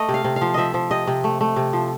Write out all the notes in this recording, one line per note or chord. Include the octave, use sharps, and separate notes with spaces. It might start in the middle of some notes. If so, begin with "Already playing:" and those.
Already playing: A3 D#5
C3
F5
C3
F5
F3
F3 D#5 E5
F3
C3 D#5
C3
A3
A3
C3
F3